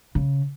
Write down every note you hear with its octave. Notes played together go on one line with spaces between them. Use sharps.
C#3